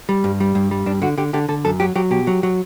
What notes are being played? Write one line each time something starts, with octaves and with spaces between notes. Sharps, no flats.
G3
G2
G3
G2
G3
G2 D4
D3 F#4
D3 G4
D3 G4
D3 A4
F#2 A4
F#3 G4
F#3 G4
B2 G4
F#3
F#3